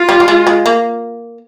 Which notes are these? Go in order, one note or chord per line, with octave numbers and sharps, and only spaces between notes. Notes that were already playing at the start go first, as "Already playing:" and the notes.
Already playing: F4
G3
G3
G#3
G#3
A#3